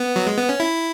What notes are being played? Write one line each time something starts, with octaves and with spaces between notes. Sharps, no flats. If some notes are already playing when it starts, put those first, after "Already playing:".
Already playing: B3
F#3
G#3
B3
C#4
E4